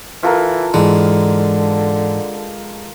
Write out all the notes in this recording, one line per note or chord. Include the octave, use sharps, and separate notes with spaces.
E3 F4 A4 A#4
G#2 D3 E3 G#3